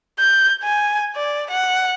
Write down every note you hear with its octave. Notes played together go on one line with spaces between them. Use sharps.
G6
G#5
D5
F#5